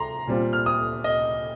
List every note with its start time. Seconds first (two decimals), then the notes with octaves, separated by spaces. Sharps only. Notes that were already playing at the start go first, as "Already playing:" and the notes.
Already playing: A#5 C6
0.27 A#2 G3 C4 F4
0.53 F6
0.66 D#6
1.04 D#5